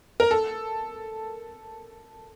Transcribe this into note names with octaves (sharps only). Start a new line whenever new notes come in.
A#4
A4